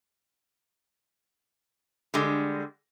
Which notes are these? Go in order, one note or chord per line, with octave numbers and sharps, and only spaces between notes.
D3 G3 G#3